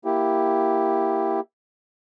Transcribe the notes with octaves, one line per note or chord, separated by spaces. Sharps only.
A#3 E4 G4